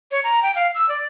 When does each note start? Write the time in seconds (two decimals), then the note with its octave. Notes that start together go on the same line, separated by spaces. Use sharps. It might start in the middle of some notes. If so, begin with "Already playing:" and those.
0.11 C#5
0.24 A#5
0.43 G5
0.55 F5
0.75 E6
0.89 D5